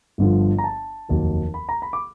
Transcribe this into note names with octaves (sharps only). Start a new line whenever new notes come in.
G1 G2 D3 F3
A#5
A5
F1 D#2 D#3 F#3
B5
A#5
B5
D6